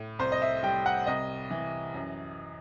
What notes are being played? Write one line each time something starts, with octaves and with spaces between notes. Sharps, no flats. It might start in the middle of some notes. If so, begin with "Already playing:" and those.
Already playing: A2
C2 C5
D#5
E5
G3 G5
F#5
C2 D#5
E3
F#2